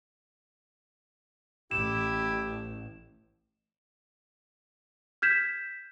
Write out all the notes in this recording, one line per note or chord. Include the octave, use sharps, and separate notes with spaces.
A1 E4 G4 E7
F6 G6 G#6 B6 E7